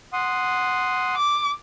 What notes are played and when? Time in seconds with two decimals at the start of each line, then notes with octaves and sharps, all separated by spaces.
0.13 F#5 C6 D#6
1.16 D6